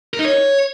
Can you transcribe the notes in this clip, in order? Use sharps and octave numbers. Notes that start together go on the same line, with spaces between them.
A#4
D#4
C#5